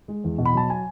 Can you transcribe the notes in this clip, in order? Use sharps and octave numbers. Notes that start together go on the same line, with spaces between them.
G#3
E2
B2
B5
F#3 A5
G#5